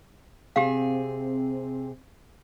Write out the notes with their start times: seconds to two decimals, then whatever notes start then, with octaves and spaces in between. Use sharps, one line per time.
0.56 C3 C4 G4 G#4 F5